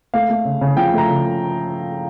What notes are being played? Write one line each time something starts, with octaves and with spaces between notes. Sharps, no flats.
A3 F5
A3
C#3
C#3
F3 G5
A3 A#5
C#3